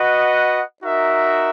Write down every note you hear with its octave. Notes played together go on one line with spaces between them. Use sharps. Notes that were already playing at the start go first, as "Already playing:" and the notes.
Already playing: F#4 B4 D#5 F#5
D#4 F#4 A#4 E5